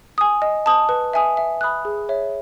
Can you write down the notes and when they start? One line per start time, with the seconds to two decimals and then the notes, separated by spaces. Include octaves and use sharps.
0.18 G#5 D#6
0.42 D#5
0.66 A5 D#6
0.89 B4
1.13 E5 G#5 D#6
1.37 E5
1.61 B5 D#6 F#6
1.85 G#4
2.09 C#5 E5